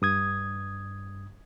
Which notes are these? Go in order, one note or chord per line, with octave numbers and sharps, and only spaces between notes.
G2 D#6 G#6